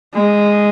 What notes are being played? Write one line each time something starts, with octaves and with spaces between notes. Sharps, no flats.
G#3